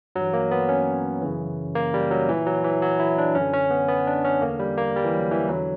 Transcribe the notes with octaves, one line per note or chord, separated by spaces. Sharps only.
G2 E3 F#3
A#3
B3
C#4
F#2 C#3 E3
A#3
G3
F#3
A#2 E3
F#3
E3
F#3
E4
D4
F#2 C#4
D3
C#4
B3
B3
D4
C#4
E2 D3 A#3
G3
A#3
G3
E3
F#3
E3
E2 D3 F#3